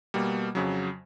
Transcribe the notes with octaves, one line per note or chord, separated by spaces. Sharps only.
B2 G3 A#3
F2 C#3 F#3